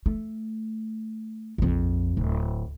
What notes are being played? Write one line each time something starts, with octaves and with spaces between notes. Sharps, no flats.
A3
A#1 F2
D1